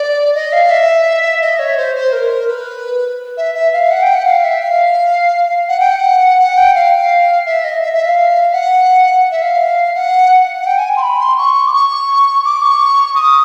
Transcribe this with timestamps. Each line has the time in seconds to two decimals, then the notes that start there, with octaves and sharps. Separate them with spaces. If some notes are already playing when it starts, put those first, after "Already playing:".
Already playing: D5
0.35 D#5
0.53 F5
0.70 E5
1.41 D#5
1.59 C#5
1.77 C5
1.95 C5
2.13 A#4
2.48 B4
3.37 E5
3.55 E5
3.73 F5
3.91 F#5
4.03 G5
4.14 F#5
4.26 F5
4.44 E5
4.62 F5
5.69 F#5
5.80 G5
5.91 F#5
6.39 F#5
6.57 G5
6.75 F5
7.46 E5
7.64 D#5
7.82 E5
7.94 E5
8.06 F5
8.53 F#5
9.31 E5
9.42 F5
9.95 F#5
10.61 F#5
10.66 G5
10.78 G#5
10.97 C6
11.02 B5
11.20 C6
11.38 C#6
11.67 D6
11.73 C#6
12.45 D6
12.62 C#6
13.15 D#6